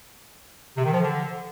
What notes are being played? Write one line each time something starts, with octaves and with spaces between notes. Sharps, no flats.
C3
D#3
F3
D3